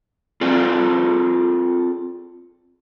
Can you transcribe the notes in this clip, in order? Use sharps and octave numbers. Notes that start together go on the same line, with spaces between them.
C4 F4 G#4 A4 D5